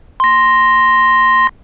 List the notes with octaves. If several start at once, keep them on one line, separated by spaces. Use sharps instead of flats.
C6 A#6